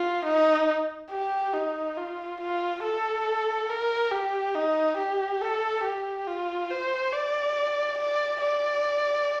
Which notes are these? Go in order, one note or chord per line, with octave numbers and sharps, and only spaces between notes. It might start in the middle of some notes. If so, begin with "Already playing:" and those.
Already playing: F4
D#4
G4
D#4
F4
F4
A4
A#4
G4
D#4
G4
A4
G4
F4
C5
D5
D5
D5